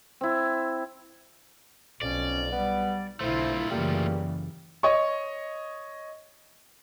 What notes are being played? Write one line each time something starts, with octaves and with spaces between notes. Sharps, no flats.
C4 E4
B1 F2 C#4 D5
G3 B3
B1 D3 A3 E4 F4 C5
F#2 C#3 E3 G3 A#3
C#5 D#5 C#6